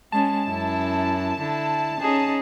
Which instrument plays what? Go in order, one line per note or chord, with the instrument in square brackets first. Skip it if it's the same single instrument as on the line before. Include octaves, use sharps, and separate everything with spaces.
[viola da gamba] G#3 C#4 [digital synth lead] A5
[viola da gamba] F#2 E4
D3 E4
C#4 D#4 G#4